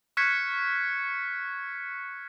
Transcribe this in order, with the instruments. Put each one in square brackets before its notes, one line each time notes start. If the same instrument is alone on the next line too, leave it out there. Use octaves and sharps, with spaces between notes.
[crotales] C#6 F6 F#6 G#6 B6 C#7